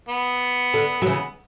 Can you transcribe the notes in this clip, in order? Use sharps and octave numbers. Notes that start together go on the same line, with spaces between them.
B3
D3
F#3
C#3 E3